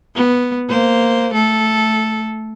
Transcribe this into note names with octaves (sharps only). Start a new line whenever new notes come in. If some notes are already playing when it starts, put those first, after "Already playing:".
B3
A#3 C5
A3 A4